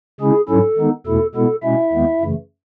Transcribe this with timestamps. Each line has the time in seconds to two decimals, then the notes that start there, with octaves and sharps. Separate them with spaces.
0.20 C#3 G#3 C#4 E4 G#4
0.48 G#2 F#3 C#4 E4 A4
0.77 D#3 G#3 B3 D#4
1.06 E2 B2 A3 E4 A4
1.35 B2 G#3 B3 E4 A4
1.63 B2 G#3 C#4 E4 E5
1.92 D#2 D#3 G#3 B3
2.21 F#2 C#3 E3 A3